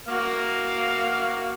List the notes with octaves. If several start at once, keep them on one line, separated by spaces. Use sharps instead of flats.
A#3 F#4 F5